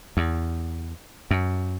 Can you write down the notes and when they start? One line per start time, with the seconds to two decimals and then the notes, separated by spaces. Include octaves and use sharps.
0.17 E2
1.31 F#2